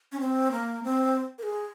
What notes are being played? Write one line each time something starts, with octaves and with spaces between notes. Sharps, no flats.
C#4
C4
A#3
C4
A#4
G#4